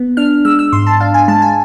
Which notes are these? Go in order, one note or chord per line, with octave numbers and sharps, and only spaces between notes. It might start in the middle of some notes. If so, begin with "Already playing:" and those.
Already playing: B3
D4 F6
G#3 E6
E6
G#2 C6
A5
D4 F5
G#5
G#3 A5
G#5